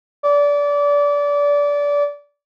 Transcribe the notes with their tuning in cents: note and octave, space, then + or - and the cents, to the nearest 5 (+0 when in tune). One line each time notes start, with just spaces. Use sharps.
D5 -25